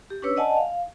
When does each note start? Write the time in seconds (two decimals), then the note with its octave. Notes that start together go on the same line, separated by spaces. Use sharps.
0.10 G4
0.22 C#4 D4 B4 C#5 E6
0.36 D5 D#5 F#5 G#5 A5
0.57 F5